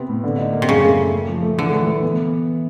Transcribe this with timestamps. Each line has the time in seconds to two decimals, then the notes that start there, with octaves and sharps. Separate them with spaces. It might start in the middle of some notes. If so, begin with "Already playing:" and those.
Already playing: C3 B3
0.08 A2
0.24 D3
0.38 D#4
0.53 A#3
0.62 C3
0.69 F#2 C#3
0.83 A3
0.99 A3
1.12 A3
1.28 F3
1.42 A3
1.58 D3 E3
1.73 E3
1.87 E3
2.02 B3